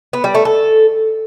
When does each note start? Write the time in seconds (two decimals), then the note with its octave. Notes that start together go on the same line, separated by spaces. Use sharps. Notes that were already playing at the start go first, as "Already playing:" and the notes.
0.13 B3
0.24 G3
0.35 A3
0.45 A4